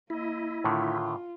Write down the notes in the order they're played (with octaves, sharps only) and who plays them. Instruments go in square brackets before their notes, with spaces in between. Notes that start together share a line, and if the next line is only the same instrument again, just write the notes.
[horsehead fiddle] A#3 D#5 [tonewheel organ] E4
[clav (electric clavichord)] A2 D3 D#3 [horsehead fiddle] F4